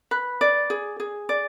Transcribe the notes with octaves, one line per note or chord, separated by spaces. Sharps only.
B4
D5
G#4
G#4
D5